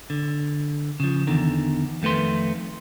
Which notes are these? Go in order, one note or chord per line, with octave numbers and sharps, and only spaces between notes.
D3
C#3 F3
E2 D3 D#3
F2 D#3 A3 B4 C6